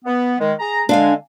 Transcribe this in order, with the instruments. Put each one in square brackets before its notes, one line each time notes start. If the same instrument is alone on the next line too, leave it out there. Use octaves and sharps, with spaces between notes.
[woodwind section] B3
D#3 G#3
G#4 A#5
[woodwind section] D3 G#3 [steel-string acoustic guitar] D4 F5 G#5